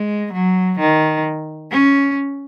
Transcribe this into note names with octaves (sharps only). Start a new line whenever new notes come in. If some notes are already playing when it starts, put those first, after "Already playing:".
Already playing: G#3
F#3
D#3
C#4